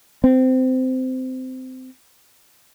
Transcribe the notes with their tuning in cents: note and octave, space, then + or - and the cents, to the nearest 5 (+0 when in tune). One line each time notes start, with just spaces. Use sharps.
C4 -20